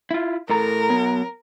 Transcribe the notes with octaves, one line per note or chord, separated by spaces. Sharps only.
E4 F4
A2 A4 A#4 A#5
F#3 B3